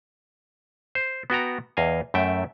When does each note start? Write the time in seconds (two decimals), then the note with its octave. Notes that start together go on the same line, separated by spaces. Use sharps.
0.95 C5
1.30 B3 F#4 G5 A#5
1.77 E2 D#5 F5 G#5
2.14 F#2 A3 E5 G5